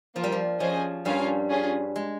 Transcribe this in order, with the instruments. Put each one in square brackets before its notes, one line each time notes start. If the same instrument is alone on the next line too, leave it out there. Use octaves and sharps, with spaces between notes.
[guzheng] F3 [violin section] A#3 F4 A#4
[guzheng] G3
F3
[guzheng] F3 [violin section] C#4 G#4 C5 D#5 G#5
[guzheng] G2 G3 [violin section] C#4 F4 A#4 F5 G#5
[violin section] C#4 F4 G#4
[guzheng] G#3